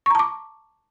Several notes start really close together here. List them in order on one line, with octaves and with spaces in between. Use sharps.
C#6 A#5 A5 D6